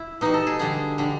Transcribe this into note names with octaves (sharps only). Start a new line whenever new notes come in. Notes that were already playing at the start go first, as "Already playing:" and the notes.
Already playing: E4
B2 G3 D#4
A4
G#4
D3 G3 G#4
D3 G3